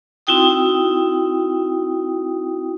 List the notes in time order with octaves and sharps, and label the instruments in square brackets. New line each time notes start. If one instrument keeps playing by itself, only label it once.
[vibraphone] C4 D#4 E4 F#4 G5 D#6